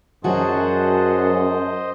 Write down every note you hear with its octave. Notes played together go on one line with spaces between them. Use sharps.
F#2 F#3 F#4 G#4 C5 D#5 F#5 A5